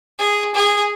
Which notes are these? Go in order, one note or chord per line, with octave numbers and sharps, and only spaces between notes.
G#4
G#4